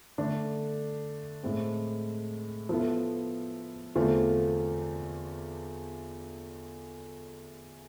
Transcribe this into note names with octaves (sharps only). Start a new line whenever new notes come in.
D3 A3 D4
A2 G#3 C4
F3 B3 E4 A4
E2 D3 A3 C4 F4